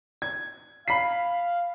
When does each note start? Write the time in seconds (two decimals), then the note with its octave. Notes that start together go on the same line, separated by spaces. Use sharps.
0.22 G#6
0.88 F5 B5 B6 C7